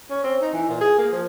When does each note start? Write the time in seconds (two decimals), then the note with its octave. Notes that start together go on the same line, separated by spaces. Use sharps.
0.10 C#4
0.24 C4
0.42 D#4
0.53 E3
0.69 A#2
0.81 G#4
0.98 A#3
1.12 F3